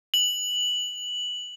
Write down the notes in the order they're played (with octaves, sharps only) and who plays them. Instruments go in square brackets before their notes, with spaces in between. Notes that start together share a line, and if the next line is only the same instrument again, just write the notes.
[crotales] F#7